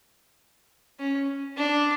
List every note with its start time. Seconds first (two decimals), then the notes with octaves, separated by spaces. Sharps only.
0.99 C#4
1.57 D4